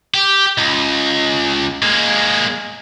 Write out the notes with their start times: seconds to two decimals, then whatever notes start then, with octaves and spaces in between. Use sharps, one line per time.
0.14 G4
0.58 C#2
1.82 G#3 A#3